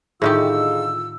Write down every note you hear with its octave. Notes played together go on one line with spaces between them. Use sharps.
A2 D3 D#3 D#4 F4 G4 G#4 E6